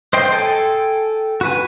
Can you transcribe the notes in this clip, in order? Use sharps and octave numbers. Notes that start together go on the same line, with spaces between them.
C5 D#5 G5 C6
A4 G5 G#5
F#4 B4 G#5